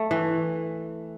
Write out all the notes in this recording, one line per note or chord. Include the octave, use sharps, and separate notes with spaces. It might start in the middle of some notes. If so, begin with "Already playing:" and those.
Already playing: A3
E3